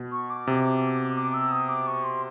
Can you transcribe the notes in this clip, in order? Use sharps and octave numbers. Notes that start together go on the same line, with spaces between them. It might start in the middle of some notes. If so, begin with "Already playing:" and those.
Already playing: B2
C#6
D6
C3
D6
E6
D#6
D6
C#6
C6